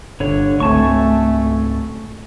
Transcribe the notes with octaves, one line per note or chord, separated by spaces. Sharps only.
G1 D3 C#5
G#1 C#2 A3 C4 G#5 A5 C#6